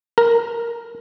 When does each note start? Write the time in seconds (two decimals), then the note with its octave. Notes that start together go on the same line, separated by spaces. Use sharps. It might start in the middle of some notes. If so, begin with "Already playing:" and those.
0.18 A#4